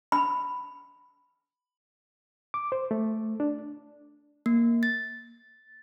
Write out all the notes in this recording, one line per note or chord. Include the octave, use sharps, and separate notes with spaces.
B5
D6
C5
A3
D4
A#3
A6